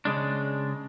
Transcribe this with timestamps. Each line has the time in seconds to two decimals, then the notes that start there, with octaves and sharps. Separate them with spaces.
0.05 C#3 G#3 D4